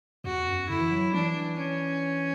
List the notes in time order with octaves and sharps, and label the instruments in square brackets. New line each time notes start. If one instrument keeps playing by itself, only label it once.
[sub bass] E2 [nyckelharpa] F#4
[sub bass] F#2
[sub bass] D3 [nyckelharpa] E4
[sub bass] E3
F#3
[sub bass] E3 [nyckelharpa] D4
[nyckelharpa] C#4